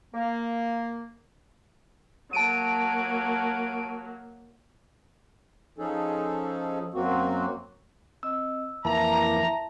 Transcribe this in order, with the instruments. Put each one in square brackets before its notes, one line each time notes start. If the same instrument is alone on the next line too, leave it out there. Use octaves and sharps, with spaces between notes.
[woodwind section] A#3
[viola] F#3 A#3 [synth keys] A5 D7 D#7
[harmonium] F3 C#4 D#4 G#4 A4
F#2 F#3 A#3 C4 F#4
[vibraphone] C4 D#5 [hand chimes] E6
[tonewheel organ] F2 E3 A#3 [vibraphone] E4 E5 [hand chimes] A5 [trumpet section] A#5